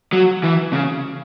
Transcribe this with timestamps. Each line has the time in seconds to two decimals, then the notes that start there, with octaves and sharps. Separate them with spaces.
0.13 F#3
0.43 E3
0.73 C#3